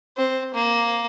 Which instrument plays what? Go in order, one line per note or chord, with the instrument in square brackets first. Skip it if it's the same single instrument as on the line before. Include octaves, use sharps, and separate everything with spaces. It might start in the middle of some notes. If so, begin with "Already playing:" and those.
[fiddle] C4
A#3